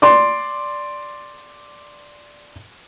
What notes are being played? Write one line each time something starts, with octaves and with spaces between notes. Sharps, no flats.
D5 C6